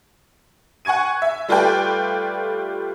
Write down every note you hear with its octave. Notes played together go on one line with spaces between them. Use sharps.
F#5 G#5 C#6 G#6 D#7
E5
G3 A3 F4 B4 D5 G5